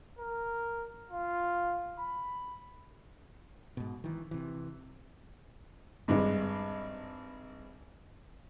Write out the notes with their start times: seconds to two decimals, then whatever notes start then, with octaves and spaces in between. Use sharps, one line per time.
0.19 A#4
1.10 F4
1.99 B5
3.77 G#2 B2
4.04 D#3 E3
4.31 C3 E3
6.08 G#1 G2 G#3